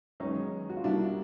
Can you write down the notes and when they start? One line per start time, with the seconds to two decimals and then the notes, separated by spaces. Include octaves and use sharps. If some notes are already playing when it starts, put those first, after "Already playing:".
0.20 F#2 D#3 G#3 B3 C#4 D#4
0.69 F#4
0.77 F4
0.84 C2 B2 G3 A#3 D4 E4